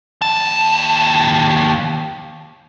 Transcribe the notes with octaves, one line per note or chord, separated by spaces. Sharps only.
D#2 A5